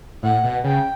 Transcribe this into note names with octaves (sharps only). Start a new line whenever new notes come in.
A2 F#5
B2
C#3 G5